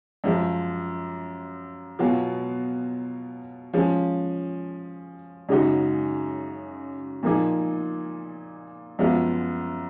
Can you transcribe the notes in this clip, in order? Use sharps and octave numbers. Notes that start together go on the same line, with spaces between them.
F#2 F3 G#3
B2 F#3 B3 F4 G#4
F3 G#3 C#4 G#4
F#2 C#3 G#3 D#4 F#4
A#2 F3 A#3 D#4 G#4
F#2 F3 G#3 B3 F4